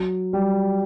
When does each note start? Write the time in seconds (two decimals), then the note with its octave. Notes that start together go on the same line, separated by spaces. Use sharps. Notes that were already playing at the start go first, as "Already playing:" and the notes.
Already playing: F#3
0.33 G3